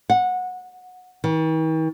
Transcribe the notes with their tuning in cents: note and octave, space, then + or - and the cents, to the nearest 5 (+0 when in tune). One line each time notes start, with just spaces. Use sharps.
F#5 -20
D#3 +45